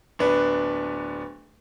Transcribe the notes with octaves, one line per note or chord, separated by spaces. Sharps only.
D1 B3 D4 B4